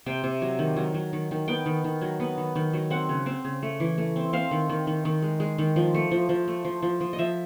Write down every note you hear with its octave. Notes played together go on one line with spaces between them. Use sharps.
C3 G5
C3
F#3
D#3
F#3
F#3
D#3
D#3
B3 G5
D#3
D#3
F#3
B3
D#3
D#3
F#3
C4 F#5
C#3
C4
C#3
A3
E3
A3
C4
C4 F5
D#3
D#3
D#3
D#3
G#3
G#3
D#3
F3
A3
F3
F3
A3
F3
F3
F3
D#5
F3 E5